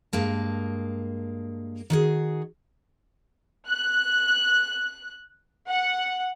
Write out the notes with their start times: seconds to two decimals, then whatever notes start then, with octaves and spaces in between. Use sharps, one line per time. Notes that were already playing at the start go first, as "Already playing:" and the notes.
0.13 G2 G#3 A#3 A5
1.90 D#3 F#4 G#4
3.68 F#6
5.69 F#5